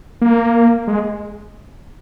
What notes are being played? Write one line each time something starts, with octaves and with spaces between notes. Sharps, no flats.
A#3
G#3